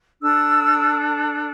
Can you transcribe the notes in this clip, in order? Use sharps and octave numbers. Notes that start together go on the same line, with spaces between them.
D4 A4 E6